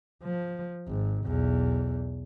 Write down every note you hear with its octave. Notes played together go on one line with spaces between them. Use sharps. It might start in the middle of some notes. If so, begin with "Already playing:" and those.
F3
G#1
B1 E2